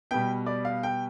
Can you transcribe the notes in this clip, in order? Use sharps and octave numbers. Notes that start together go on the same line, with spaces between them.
B2 G3 B3 G5
D5
F5
G5